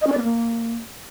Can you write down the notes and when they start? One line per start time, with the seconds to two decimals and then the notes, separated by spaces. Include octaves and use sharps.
0.01 D#5
0.07 C#4
0.12 D5
0.17 B3
0.23 A#3